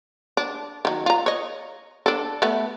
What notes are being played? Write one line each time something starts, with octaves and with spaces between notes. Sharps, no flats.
D4
D#3 F#3
F4 A#5
C#5 D#5
D4 A4
A3 B3